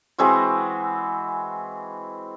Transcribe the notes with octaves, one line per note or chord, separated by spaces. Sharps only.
E3 G#3 C4 F#4